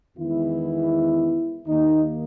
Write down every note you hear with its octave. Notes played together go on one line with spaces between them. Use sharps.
E2 D#3 G#3 B3 E4
D#2 D#3 A#3 D#4